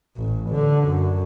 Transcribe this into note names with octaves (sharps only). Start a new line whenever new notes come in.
A1
D3
F#2